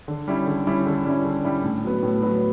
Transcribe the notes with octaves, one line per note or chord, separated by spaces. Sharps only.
D3
G3 C#4 E4
D3
G3 C#4 E4
D3
G3 C#4 E4
D3
G3 C#4 E4
A2
F#3 B3
A2
F#3 B3